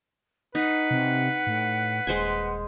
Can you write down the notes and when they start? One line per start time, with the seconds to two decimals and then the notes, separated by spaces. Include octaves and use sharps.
0.55 D#4 B4 F#5
0.91 C3
1.47 A2
2.07 D#1 G#3 C5 G#5